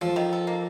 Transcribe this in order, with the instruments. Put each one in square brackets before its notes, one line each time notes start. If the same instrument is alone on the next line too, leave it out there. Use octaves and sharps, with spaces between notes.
[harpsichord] F3 [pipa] A4
[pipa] D#3
A4
A#3